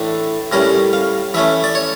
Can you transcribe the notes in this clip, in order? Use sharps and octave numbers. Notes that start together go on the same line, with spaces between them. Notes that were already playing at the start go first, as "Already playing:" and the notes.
Already playing: A2 E3 A3 D4
A2 G3 C#4 A#4
F5
E3 A3 C#4 E5
D5
C#5